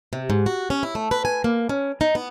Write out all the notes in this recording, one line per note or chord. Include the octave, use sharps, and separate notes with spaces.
C3
G#2
F#4
C#4
E4
A3
B4
G#5
A#3
C#4
D#4
B3